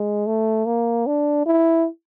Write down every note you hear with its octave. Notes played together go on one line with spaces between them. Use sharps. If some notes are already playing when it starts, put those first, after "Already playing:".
Already playing: G#3
A3
A#3
D4
E4